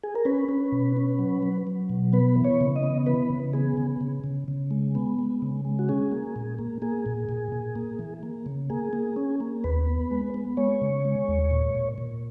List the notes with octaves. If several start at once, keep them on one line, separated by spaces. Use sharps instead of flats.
G#4
A#4
C#4 B4
C#4
B2
C#4
F#3
F#3
F#3
B2
B3 B4
E3
C#5
C#3
D#5
B3
E3 B4
C#3
B3 G#4
C#3
C#3
C#3
C#3
G#3
B3
G#3
C#3
G#3
F#4
C#4 G#4
A#3
A#2
A#3
A#3 G#4
A#2
A#2
A#2
A#3
E3
A#3
C#3
A#3 G#4
A#3
C#4
A#3
D#2 B4
B3
G#3
B3
G#3 C#5
C#3
G#3
D#2
A#2
A#2
A#2